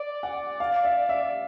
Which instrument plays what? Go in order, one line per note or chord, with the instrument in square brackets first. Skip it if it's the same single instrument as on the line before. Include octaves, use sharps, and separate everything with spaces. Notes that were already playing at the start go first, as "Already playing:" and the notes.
Already playing: [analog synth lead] D5
[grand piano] F#5
F5
E5
E5